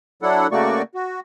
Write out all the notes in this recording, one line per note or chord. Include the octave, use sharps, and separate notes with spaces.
F#3 D4 E4 A4 F#5
C#3 A3 A#3 F#4 D5 C#6
F#4